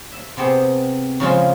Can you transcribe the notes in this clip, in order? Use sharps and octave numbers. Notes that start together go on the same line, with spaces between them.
E5
C3 B3 C4 G4 G#4
C#3 F3 G#3 F4